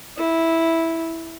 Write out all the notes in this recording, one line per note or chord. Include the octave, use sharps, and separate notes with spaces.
E4